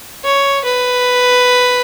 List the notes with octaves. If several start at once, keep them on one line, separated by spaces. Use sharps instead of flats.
C#5
B4